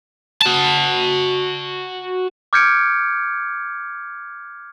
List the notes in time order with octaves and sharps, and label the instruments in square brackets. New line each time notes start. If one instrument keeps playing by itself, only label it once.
[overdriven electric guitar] F#4 A5
[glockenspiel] D6 F6 G6 G#6 C#7 D7